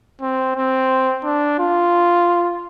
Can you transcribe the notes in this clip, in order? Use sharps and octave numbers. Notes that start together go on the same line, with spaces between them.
C4
C4
D4
F4